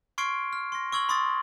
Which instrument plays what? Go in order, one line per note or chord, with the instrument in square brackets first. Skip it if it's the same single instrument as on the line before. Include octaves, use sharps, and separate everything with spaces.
[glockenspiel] C6 C#6 F6 G#6 C7 D7
F6
C6 A#6
C#6 E6 G#6 F#7 G7
B5 C6 D#6 A6